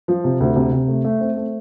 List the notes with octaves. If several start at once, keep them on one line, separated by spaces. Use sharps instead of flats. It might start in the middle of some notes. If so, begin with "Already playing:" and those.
F3
C3
D2
C3
C3
A3
A3
C4
A3